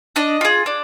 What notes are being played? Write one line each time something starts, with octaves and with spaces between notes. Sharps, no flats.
D4 D#5
F4 G#4
D4